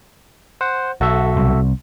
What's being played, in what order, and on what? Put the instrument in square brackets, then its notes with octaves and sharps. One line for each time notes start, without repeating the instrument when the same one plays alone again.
[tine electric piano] C5 F#5
[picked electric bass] B1 [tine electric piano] F#4 A4 E5
[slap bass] C2